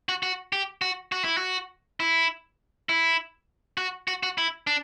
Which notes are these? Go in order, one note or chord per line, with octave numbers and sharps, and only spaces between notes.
F#4
F#4
G4
F#4
F#4
E4
F#4
E4
E4
F#4
F#4
F#4
E4
D4